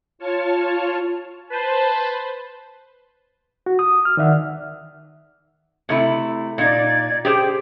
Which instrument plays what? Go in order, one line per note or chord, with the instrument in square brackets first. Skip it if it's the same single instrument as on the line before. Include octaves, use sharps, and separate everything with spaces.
[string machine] F4 C#5 A5 C#6 F6
[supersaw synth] B4 C5 [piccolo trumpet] A5
[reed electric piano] F#4
D#6
F6
D#3 D5 E5 F#5
[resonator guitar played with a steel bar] C3 A3 E4
[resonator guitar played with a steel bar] A#2 D#4 [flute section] D5 G#6
[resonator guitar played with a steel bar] G4 G#4 C5 [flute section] G5